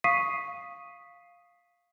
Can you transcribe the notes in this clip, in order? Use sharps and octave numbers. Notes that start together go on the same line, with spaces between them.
F5 C#6 D#6 B6 C7 D#7